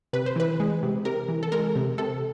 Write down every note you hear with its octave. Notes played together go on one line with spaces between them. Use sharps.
C3 B4
C5
E3 B4
G#3
C3
C3 A#4
E3
A4
G#3 A#4
C3
C3 A4